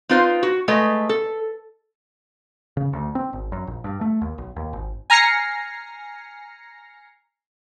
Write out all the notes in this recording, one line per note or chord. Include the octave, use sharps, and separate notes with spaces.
C4 D#4 F4 B4 C5
F#4
G#3 A3 B4 D#5
A4
C#3
D2
C4
G#1
F#2
A#1
G2
A3
D#2
B1
D#2
G#1
G#5 A#5 F6 A#6 C7 C#7